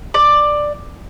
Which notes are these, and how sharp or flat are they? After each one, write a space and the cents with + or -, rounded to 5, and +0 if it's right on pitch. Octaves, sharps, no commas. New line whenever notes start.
D5 +10